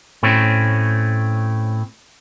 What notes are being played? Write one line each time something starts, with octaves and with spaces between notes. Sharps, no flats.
A2 A3 C4 C#4